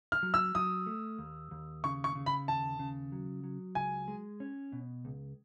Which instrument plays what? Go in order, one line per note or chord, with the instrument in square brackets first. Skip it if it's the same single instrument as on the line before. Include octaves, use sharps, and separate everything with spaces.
[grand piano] F6
[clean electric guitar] F#3
[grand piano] E6
[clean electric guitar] F#3 [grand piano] D#6
[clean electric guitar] A3
D#2
D#2
[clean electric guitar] C#3 [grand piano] C#6
[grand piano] C#6
[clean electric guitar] C#3
[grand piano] B5
[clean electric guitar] D#2 [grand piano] A5
[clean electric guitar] C#3
F#3
F#3
[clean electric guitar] C#2 [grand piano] G#5
[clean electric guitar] G#3
C#4
B2
C#2